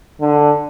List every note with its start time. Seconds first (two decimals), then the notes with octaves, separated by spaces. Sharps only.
0.21 D3